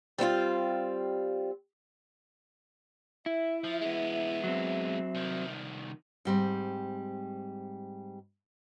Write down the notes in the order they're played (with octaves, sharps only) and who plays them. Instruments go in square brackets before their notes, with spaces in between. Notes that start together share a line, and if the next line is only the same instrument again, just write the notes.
[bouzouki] G3 C4 E4 F4
[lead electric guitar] E4 [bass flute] E5
[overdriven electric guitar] F3
G#3 B3
[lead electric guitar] F#3 C4
[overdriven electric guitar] C2 D#3
[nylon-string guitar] G#2 G3 C4